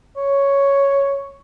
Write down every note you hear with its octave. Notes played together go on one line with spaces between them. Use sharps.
C#5